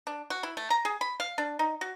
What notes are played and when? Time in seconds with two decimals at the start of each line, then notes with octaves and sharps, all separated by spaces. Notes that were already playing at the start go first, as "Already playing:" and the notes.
0.07 D4
0.30 F#4
0.43 E4
0.57 A3
0.70 A#5
0.85 G#4
1.01 B5
1.20 F5
1.38 D4
1.59 D#4
1.81 F#4